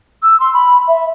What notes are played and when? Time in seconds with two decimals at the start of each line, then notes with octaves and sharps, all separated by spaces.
0.23 E6
0.40 C6
0.54 B5
0.88 E5